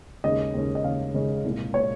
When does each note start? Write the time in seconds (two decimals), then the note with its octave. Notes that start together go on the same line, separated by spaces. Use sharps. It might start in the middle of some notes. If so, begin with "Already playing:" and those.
0.24 D#2 C#3 G#3 C#4 D#5
0.53 D#2 C#3 G#3 C#4
0.75 D#5
0.84 D#2 C#3 G#3 C#4 F5
1.14 D#2 C#3 G#3 C#4
1.44 C2 A#2 G#3
1.74 A#2 G#3 C#5